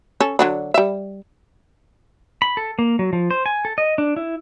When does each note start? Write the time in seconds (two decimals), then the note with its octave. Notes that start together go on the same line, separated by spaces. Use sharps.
0.20 C#4 A4
0.39 D3 F#3 D4
0.74 G3 E5
2.42 B5
2.57 A4
2.79 A#3
2.99 F#3
3.13 F3
3.31 C5
3.46 G#5
3.65 A4
3.78 D#5
3.98 D4
4.17 E4